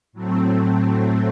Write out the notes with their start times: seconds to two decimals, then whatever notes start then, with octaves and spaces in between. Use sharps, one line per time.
0.13 A2 F#3 A3 C4